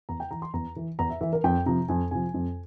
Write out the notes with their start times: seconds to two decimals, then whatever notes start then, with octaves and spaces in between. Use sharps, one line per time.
0.09 E2 A#5
0.20 G5
0.31 E3 A#5
0.42 C6
0.54 E2 A#5
0.76 E3
0.99 E2 A#5
1.10 E5
1.21 E3 E5
1.33 A#4
1.44 F2 G5
1.66 C3 F3 A#5
1.89 F2 G#5
2.11 C3 F3 G#5
2.34 F2